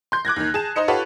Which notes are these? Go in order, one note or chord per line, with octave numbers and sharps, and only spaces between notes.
C6 G6
D6 F#6 G#6 A#6
D#2 D#3
G#4 A5 E7
D#4 C5 D#5 C#7
F4 G4 A4 B4 C#5 F#5